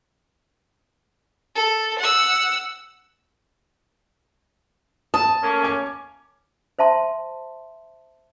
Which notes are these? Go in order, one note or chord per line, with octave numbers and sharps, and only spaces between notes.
A4
F#5 E6
A5 D#6
A3 A#3 C#4
G#5 D6 G#6
C5 E5 A5 C6